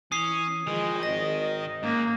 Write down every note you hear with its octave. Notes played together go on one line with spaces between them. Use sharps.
E3 C#4 D#6 C7
D#3 F3 G#3
G#1 D#5 A#6
G#2 A#3 C#4